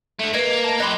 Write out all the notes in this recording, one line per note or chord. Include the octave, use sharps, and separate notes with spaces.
D3 A3
A#3 B4 D#5 G#6
A5
F#3 G4 D#5 B5 C6